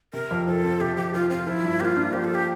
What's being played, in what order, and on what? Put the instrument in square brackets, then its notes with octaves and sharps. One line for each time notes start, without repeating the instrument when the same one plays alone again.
[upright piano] C3 [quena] A#4
[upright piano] F2
[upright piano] F3 [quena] A4
[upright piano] C4
[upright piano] C3 [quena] G4
[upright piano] F2 [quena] G4
[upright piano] F3 [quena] F4
[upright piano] C4 [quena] F4
[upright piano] F3 [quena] E4
[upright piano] G2
[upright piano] A#3 [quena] F4 G4
[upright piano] D4
[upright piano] F3 [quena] G4
[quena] A4
G4